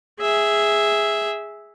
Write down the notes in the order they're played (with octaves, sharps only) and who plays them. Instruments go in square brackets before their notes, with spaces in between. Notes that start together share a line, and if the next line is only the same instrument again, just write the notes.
[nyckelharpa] G#4 E5